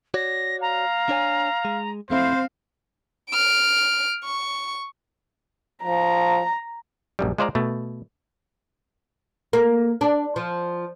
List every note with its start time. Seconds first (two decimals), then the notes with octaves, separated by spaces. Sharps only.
0.14 F#4 C#5 D5 A#6
0.61 F5 A#5
1.09 D4 C#5 G#5
1.65 G#3
2.10 F2 A3 C4 E4 C5 F5
3.31 F6 D7
4.24 C#6
5.84 F3 A#5
7.19 A#1 F#2 G3
7.38 G#3 F4 C5 D5 F5 A#5
7.55 B2 A3
9.53 A#3
10.01 D4
10.36 F3